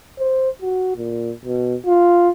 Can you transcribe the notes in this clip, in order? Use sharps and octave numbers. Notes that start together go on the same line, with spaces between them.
C5
F#4
A#2
B2
F4